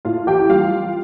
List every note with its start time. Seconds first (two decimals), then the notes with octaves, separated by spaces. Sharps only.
0.05 A2 F4 F5
0.27 A1 G4 G5
0.49 G3 F4 F5